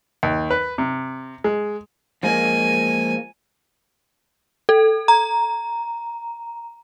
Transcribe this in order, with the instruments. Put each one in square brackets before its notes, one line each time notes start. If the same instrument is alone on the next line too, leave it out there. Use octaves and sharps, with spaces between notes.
[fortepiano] D#2
B4
C3
G#3
[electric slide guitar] F3 G#3 A#3 [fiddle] G#5
[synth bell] A4
A#5